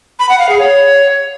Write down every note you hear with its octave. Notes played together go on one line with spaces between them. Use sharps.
B5
F#5
F5
G#4
C#5